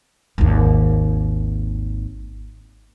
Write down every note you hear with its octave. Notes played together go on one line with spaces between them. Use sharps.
G#1 D#2